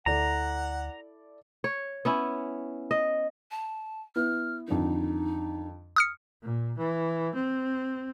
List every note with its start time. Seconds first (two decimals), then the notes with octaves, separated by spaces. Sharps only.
0.06 D2 E4 A4 D5 F#5 A#5
1.64 C#5
2.05 B3 C#4 E4
2.91 D#5
3.51 A5
4.16 B3 E4 F6
4.68 F2 D3 D#3 D#4
5.96 D#6 F6 C#7
6.42 A#2
6.78 E3
7.35 C4